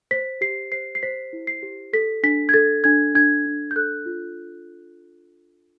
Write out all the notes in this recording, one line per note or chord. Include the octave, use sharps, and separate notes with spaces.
C5 B6
G4 C7
C5 C7
C7
C5 B6
E4
C7
G4
A4 B6
D4 B6
G#6
A4 A6
D4 G#6
D4 G#6
D4
G6
A4 F#6
F4